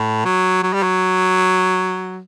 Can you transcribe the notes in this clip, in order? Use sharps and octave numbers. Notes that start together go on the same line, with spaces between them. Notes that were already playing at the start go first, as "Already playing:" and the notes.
Already playing: A2
F#3
F#3
G3
F#3